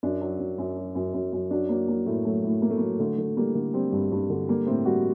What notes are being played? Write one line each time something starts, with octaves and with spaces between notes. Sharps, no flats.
F#2 D4
F#3
F#2
F#2
F#3
F#2
F#2
F#2
F#3 D4
F#3 A#3
F#3 A#3
A2 A3
F#3 A3
A2
A2 A#3
A3
F#3 A#3
D3 A3
D3
G3 A#3
D3
G3 C4
G2
G2
D3
G3 A#3
A2 C4
G3 F#4